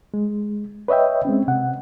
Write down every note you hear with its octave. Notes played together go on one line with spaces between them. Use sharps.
G#3
B4 C#5 D#5 E5 G5
G#3 C4 C#4
C3 F#5